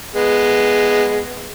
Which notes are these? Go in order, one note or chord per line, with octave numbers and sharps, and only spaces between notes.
G#3 B3